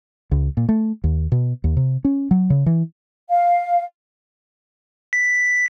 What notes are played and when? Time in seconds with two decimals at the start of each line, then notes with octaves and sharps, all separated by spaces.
0.31 C#2
0.57 A#2
0.69 A3
1.04 D#2
1.32 B2
1.64 D#2
1.77 C3
2.05 C#4
2.31 F#3
2.50 C#3
2.66 E3
3.30 F5
5.13 B6